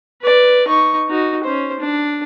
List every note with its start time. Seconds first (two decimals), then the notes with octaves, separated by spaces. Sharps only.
0.22 B4 D5
0.67 D#4 C#6
1.09 D#4 F#4
1.43 C#4 C5
1.80 D4